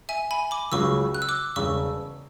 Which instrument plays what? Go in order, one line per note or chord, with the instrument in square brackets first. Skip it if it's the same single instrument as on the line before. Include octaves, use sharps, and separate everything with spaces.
[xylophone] E5 G#5
G#5 B5
B5 D6
[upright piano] C#2 C#3 F#3 [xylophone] C#6 E6
[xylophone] F#6
E6
D6 F#6
[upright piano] E1 E2 C#3 [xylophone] C#6 E6